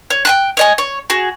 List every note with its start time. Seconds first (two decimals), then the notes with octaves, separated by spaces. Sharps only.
0.10 C#5
0.25 G5 G#5 F#6
0.57 C#5 D#5 G#5
0.78 C#5
1.10 F#4 G#4